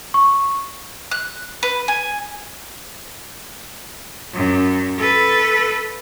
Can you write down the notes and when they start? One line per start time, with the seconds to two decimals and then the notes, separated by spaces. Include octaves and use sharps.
0.14 C#6
1.11 F#6
1.63 B4
1.88 G#5
4.33 F#2
4.98 A4 B4